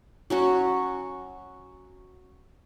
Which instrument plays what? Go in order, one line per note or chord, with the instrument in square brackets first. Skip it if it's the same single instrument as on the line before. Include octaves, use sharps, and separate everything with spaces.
[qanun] F#3 C#4 F#4